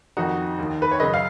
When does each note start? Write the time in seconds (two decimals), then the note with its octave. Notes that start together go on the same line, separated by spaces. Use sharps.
0.17 F2 D#3 D#4 F#4
0.58 D#2 D#3
0.82 B4
0.91 C#5
1.00 F#2 C#3 B4 D#5
1.14 F5